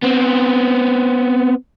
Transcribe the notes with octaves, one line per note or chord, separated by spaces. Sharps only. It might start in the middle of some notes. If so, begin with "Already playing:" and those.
B3 C4